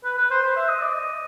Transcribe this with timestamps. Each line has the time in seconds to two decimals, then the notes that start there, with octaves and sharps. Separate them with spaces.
0.04 B4
0.17 B4
0.31 C5
0.43 C5
0.56 E5
0.68 D#5
0.81 D5
0.93 D#5